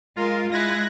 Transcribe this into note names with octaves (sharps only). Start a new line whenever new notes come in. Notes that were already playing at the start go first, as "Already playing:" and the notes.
G#3 F4 A#4
G#3 E4 F#6 G#6 A#6